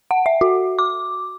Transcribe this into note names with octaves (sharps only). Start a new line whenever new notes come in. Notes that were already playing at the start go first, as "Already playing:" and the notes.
F#5
E5
F#4
D6